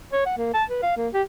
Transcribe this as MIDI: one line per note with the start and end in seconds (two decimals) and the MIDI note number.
0.13 0.26 73
0.26 0.37 78
0.38 0.53 58
0.54 0.64 81
0.70 0.82 71
0.82 0.94 77
0.97 1.08 58
1.14 1.22 67